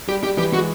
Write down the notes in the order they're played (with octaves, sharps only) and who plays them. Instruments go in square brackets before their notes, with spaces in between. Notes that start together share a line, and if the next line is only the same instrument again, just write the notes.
[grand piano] G3 [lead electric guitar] G4
[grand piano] G3 [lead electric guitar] G4
[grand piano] E3 [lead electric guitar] G4
[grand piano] G#3 [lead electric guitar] F#4